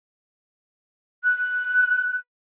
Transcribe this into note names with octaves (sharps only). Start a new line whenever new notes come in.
F#6